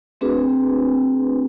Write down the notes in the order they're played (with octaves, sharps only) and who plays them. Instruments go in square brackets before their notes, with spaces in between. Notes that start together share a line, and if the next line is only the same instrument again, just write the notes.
[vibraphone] A3 C4 D4 F#4 G#4 B4